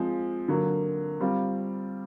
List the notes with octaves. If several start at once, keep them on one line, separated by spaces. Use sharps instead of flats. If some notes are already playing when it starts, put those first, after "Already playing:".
Already playing: F3 G#3 C4
D3 F#3 A#3
G3 C4 F4